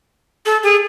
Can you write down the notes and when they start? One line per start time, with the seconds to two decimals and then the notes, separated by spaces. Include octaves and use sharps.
0.46 A4
0.63 G#4